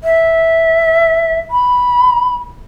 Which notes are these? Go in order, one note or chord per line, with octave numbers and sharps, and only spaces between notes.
E5
B5